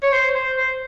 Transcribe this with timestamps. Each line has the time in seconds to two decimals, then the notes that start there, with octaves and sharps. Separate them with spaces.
0.03 C#5
0.12 C5
0.35 C5
0.57 C5